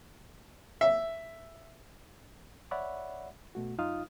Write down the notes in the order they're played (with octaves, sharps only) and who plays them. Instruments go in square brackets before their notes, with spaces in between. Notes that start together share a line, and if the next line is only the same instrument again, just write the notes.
[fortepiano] E5
[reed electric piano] C#5 D5 E5 F#5 B5
B2 A3 F#4
F#2 D#4 F4 F5 D#6 F6